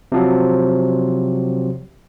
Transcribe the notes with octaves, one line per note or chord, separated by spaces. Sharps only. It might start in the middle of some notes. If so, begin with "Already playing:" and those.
C3 F3 F#3